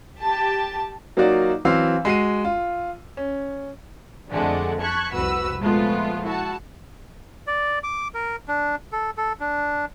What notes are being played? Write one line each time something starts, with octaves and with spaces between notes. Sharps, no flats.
G4 A5
F#3 A#3 D#4 F4 F#4 D5
E3 F#3 C4 F5 C6 E6
G#3 F#4 C7 D#7
F4
C#4
F2 D3 G#3 A3 D5 F#5
A5 C#6 F#6 G#6 B6
C2 F2 F#4 B4 E6
A#2 F3 G#3 A3 B3 F4
E4 F#4 A5
D5
D6
A#4
D4
A4
A4
D4